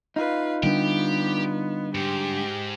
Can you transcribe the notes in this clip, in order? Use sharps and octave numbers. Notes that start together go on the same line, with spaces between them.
D#4 F4 B4 F5
D3 G3 B3 D4 G4
G#2 G4